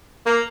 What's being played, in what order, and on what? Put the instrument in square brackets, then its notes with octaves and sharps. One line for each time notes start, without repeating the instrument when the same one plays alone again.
[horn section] A#3